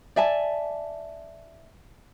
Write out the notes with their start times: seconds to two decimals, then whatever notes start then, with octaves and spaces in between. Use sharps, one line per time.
0.16 D5 E5 G#5 A5